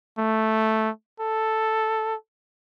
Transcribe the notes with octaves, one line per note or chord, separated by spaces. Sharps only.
A3
A4